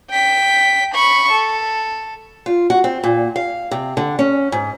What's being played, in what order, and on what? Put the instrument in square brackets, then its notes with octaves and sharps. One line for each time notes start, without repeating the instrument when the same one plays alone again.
[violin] G5 B6
B5 C#6
A4
[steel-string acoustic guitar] F4
F#4
C4
A#2
F5
C3
D3
C#4
G#2